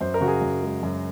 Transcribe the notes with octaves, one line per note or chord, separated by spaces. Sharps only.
F#2 C5
A#4
C#3 F#4
G#4
F#2
G#3
F#2